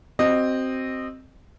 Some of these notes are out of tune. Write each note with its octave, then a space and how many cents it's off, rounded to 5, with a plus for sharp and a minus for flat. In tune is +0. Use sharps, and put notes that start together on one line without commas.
C4 +0 F#4 +40 D#5 -15